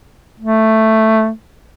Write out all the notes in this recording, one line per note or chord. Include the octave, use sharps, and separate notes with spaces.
A3